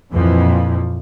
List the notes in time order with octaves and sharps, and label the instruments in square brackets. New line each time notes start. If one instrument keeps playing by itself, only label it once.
[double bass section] F2 A#2 E3 F3